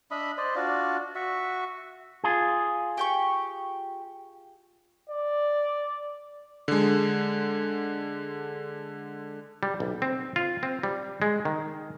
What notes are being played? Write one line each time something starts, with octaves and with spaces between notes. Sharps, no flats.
D4 D#5 E5 B5
C5 D5 D#5
D4 F4 F#4 D5
F#4 E5 C#6
F4 G#4
G4 G5 C#6
D5
D3 G#3
G3
B1
C4
F4
C4
G3
G#3
D#3